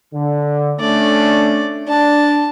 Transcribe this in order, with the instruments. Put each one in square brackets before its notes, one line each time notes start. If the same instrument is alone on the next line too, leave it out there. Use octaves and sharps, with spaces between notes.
[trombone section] D3
[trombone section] A3 C#4 D4 [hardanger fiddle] D5
[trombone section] D4 [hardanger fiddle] A5